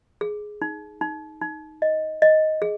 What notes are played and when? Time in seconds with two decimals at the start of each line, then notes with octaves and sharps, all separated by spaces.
0.21 G#4
0.62 D#4
1.01 D#4
1.41 D#4
1.82 D#5
2.22 D#5
2.62 G#4